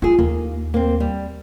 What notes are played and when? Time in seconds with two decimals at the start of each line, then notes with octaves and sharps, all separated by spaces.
0.02 E4 F4 G#4
0.19 D#2 A#3
0.74 A#3 C4
1.00 G3